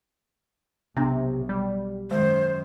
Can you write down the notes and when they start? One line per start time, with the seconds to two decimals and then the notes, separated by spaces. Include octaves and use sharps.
0.97 B1 C3 B3 D4
1.49 G3
2.11 F#2 D#3 G#3 C5